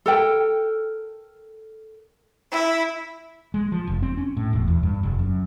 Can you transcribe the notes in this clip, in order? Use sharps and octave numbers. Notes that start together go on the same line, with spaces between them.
A4 A#4 G5
E4
G#3
F3
F1
C4
C#4
A2
E1
E2
G2
F1
F#2